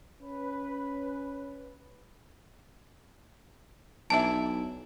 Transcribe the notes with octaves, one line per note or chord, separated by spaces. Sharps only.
C#4 B4
B1 E3 D4 E4 A5